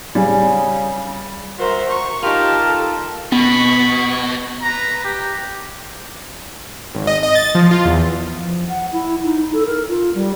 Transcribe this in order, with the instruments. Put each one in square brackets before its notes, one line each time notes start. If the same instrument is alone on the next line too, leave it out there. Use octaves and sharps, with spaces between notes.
[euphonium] C#3 [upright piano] G3 G#4
[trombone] F#4 [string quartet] A#4 C5 E5
[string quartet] A#5 C#6
[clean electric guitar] D#4 F4 [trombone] G4 [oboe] A#4 [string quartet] A5
[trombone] A4
[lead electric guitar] B2 [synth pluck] B3 [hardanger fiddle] B5 C#6
[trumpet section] B4 A#5
G4
[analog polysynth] G#1
D#5
D#5
A6
F3
F4
E2
[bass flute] F3
F#5
E4
D#4
A4
A#4
F4
G3